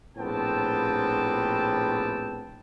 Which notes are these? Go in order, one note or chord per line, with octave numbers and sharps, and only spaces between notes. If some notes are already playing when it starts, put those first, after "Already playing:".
A#1 A2 B3 C4 G5 A5